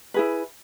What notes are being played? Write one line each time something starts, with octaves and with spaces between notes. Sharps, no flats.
E4 G#4 B4